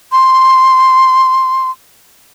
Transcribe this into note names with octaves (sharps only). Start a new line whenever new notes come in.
C6